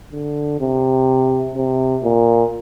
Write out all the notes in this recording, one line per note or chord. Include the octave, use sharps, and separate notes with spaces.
D3
C3
C3
A#2